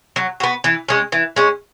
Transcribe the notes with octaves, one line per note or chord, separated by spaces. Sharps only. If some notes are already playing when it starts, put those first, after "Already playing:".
F#3
B3 F#4
E3
G#3 C#4
E3
G#3 C#4